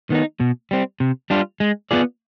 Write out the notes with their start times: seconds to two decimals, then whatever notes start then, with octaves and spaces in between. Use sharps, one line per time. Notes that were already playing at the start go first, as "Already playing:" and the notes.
0.10 D#3 B3 D#4
0.40 B2
0.71 G3 C4
1.00 C3
1.30 G3 D4 F4
1.60 G#3
1.91 B3 F4 G#4 D5